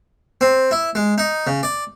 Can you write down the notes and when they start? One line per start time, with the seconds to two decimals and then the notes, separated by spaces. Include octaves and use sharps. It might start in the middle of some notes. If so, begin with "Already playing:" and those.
0.41 C4
0.71 E4
0.95 G#3
1.18 D#4
1.47 C#3
1.63 D5